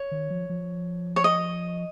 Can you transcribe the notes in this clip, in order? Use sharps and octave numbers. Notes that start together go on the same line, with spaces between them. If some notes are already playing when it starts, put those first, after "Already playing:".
Already playing: C#5
D#3
F3
F3
C#5
D#5